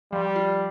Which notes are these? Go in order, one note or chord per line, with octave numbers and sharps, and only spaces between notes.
F3 G3
F4